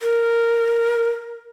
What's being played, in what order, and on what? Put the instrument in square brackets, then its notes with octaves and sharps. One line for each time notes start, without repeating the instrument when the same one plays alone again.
[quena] A#4